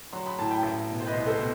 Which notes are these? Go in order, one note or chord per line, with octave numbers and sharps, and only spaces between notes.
F#3 C6
B5
A2 A5
G5 B5
A1
B2
C5
B4 D#5
C2
A4 C5
B2